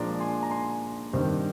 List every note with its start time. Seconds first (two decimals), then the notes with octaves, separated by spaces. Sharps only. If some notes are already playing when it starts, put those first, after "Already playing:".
Already playing: A#2 F3 G#3 D4 A#5 D6
0.20 G#5 C6
0.43 A#5
0.51 G#5 C6
1.13 G2 D#3 G3 C4